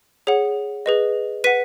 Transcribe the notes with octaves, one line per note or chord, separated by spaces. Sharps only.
G#4 C#5 F#5
G#4 B4 D#5
B4 F#5 B6 D#7